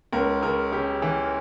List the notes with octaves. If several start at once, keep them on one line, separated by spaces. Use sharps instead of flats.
C#2 A#4
C#3 A#4
C#3 G4
E3